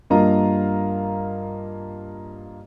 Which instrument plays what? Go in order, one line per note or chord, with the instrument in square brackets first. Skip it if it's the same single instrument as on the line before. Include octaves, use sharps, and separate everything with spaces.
[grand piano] G2 A#3 F4 D#5 A#5